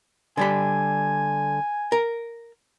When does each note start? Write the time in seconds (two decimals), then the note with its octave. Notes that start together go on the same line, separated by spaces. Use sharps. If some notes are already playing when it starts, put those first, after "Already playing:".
0.37 D3 G3 G#5 B5
1.92 A#4